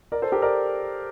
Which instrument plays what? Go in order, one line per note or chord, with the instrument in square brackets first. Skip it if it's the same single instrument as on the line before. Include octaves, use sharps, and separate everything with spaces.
[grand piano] A#4 D5
A4 C5
G4 A#4
A#4 D5